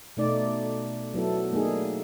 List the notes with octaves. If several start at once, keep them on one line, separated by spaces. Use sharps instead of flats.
B2 A3 D#4 D5
F#3 B3 E4 A4
A3 A#3 D4 D#4 G#4